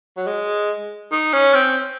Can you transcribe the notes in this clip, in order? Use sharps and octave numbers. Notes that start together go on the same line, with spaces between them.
F#3
G#3
D#4
C#4
C4